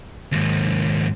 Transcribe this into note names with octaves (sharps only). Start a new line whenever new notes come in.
D#2 G#2